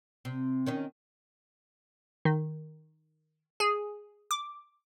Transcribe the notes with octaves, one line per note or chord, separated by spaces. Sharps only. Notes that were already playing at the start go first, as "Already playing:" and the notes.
C3
D#3 C#4 D#4
D#3
G#4
D6